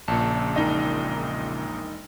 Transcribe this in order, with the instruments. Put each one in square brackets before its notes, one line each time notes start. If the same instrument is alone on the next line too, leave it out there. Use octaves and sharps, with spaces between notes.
[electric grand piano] A#1 A#2 [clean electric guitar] C#3 C#5 A5
[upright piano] E1 D#4 D#5